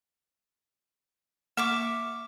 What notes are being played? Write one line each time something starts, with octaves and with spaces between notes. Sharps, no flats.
A#3 E5 C#6 D6